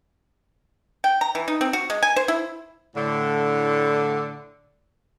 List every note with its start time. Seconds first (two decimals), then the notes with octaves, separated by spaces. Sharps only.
1.04 G5
1.21 A#5
1.35 E3
1.48 D#4
1.61 C4
1.73 F#4
1.90 G#3
2.03 G#5
2.16 C5
2.28 E4
2.95 A2 D3